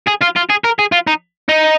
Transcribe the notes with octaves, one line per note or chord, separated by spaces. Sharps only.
G#4
F4
F4
G#4
A#4
G#4
F4
D#4
D#4